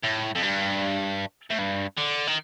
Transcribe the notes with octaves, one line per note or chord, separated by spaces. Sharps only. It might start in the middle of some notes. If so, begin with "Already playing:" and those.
A2
F2
G2
A2
G2
D3
D#3